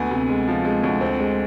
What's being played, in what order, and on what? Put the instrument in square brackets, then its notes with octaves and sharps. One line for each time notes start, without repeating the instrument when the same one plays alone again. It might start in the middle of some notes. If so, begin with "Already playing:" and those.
Already playing: [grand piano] D2 B3 G#5
C3
G#3
F3
G#3
D2
C4
G#3